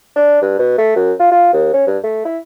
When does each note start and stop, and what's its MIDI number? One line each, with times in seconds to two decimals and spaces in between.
0.16 0.39 62
0.42 0.58 43
0.59 0.77 47
0.78 0.94 57
0.96 1.13 42
1.20 1.32 65
1.32 1.49 65
1.53 1.69 39
1.74 1.85 61
1.87 1.98 43
2.04 2.23 57
2.25 2.38 64